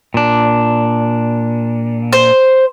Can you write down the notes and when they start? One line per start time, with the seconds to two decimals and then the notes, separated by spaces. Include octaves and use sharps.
0.14 A#2 D4
2.13 C5